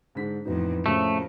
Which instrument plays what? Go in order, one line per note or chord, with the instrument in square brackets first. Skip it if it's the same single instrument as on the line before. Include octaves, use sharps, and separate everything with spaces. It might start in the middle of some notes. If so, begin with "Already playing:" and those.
[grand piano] G#2 D3 B6
[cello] F2 A2 [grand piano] E3 B3 D#4
[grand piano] A2 C#3 F3 [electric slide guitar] A3 [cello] A#3